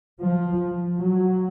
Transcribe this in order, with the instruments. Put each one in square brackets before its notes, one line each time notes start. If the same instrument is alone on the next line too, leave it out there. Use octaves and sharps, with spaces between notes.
[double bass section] F3
F#3